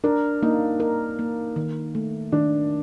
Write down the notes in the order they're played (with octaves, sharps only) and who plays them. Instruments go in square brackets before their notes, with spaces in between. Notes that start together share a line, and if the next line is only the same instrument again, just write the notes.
[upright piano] D4 [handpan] A#4
[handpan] A#3 [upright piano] D#4
[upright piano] D#4 [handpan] A#4
[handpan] A#3
D#3
A3
[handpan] D#3 [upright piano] D4